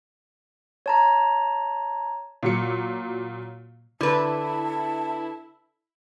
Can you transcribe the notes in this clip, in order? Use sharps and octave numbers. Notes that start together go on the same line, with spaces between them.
C#5 A5 A#5
A#2 F#3 C#7
D3 E4 B4 A5